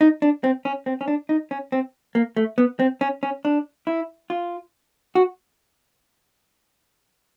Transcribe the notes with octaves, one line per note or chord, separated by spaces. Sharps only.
D#4
D4
C4
C#4
C4
C#4
D4
D#4
C#4
C4
A#3
A3
B3
C4
C#4
C#4
D4
E4
F4
F#4